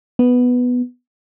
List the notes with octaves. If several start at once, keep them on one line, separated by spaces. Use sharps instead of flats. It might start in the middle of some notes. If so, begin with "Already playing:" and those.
B3